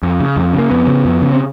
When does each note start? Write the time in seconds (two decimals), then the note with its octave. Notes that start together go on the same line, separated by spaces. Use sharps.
0.03 F2
0.20 C#3
0.37 F2
0.53 C#3
0.58 A#3
0.70 F2 B3
0.87 C#3
1.05 F2
1.22 C#3
1.33 C4